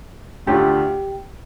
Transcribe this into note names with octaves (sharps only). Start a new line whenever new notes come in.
D2 D3 A3 D4 F4 G4